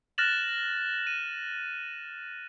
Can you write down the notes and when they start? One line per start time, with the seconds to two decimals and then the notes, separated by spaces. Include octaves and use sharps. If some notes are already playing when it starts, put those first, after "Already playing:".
0.18 F6 F#6 A6 A#6 E7 F#7
1.07 D#7